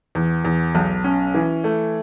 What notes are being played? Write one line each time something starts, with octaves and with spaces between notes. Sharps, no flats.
E2
E2
B1
C#4
E3
A3